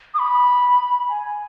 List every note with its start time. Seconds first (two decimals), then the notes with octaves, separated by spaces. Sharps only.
0.14 D#6
0.19 B5
1.09 G#5